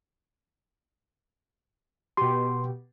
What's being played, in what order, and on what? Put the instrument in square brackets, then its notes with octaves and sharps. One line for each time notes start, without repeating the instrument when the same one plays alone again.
[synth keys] B2 G4 [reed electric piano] C6